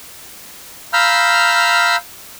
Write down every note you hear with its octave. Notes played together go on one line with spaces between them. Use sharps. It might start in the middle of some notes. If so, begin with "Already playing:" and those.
F5 A#5 B5 E6 F6 G6